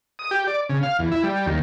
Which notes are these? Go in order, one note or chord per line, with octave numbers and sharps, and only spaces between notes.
D#6
G4
D5
C#3
F5
E2
E4
G3
D#2